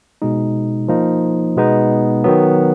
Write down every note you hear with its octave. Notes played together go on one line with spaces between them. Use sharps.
B2 G#3 D#4
F3 A#3 D#4
B2 G#3 B3 D#4
D#3 F#3 B3